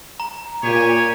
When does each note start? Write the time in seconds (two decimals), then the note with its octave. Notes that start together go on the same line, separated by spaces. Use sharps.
0.20 A#5
0.63 A#2 G4 C#5 G#5